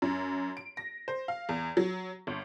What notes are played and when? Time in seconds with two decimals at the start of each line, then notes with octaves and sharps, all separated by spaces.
0.02 F#2
0.57 D7
0.77 A#6
1.08 C5
1.28 F5
1.49 E2
1.77 F#3
2.27 G1